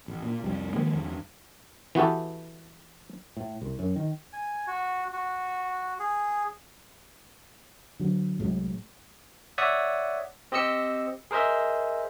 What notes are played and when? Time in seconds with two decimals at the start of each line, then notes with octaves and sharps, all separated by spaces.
0.08 A1
0.22 A#2
0.42 C2 F2 G3
0.73 D#3 F3 G#3 A#3
0.95 E2 G2
1.95 E3 B3 F#4 G4 A4
3.37 A2
3.62 C2
3.79 F#2
3.96 D#3
4.33 G#5
4.67 F#4
5.13 F#4
6.00 G#4
7.99 D3 F#3
8.39 C2 A2 F#3 G#3
9.58 C#5 D5 E5 F#5 D#6
10.52 C4 G4 D#5 E6 C#7
11.31 G#4 A#4 C5 D#5 E5